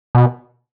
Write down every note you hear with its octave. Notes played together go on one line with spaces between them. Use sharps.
B2